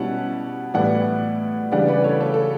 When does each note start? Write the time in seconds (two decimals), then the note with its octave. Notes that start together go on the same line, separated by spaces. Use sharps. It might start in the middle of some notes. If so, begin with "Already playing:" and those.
Already playing: B2 G3 C#4 E4 F#5 A5
0.74 A2 E3 G3 B3 E4 D5 F#5
1.72 C#3 E3 G3 D4 D5 F#5
1.88 B4 D5
2.04 A4 C#5
2.21 A4 C#5
2.34 A4